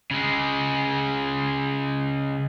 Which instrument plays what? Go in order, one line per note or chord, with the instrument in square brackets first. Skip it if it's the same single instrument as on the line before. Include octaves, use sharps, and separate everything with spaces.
[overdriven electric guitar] C#3 G#3